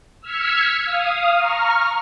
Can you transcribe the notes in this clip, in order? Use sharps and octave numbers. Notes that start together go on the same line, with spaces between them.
E6 F6 G#6 B6 C#7
F5 D#6
A#5 C#6 F6